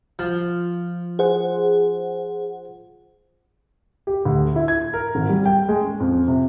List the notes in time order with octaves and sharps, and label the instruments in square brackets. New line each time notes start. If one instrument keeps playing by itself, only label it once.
[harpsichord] F3
[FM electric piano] G#4 C5 F#5
[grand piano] G4
D2
E4
G#6
A#4
G#1
G3
G5
G#3
C#4
F2
C3